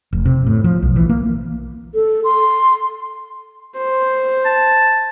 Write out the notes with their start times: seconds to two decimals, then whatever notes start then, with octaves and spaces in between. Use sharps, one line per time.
0.13 F1
0.26 C3
0.47 A2
0.64 F3
0.82 B1
0.96 E3
1.09 A#3
1.94 A4
2.24 C6
3.77 C5
4.45 A5